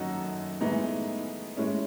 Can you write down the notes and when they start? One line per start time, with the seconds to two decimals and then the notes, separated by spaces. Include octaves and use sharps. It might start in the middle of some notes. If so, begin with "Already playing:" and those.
Already playing: F#2 D#3 F#3 D#4 F#4 A4
0.61 A2 E3 G#3 B3 D#4
1.57 A2 G#3 C#4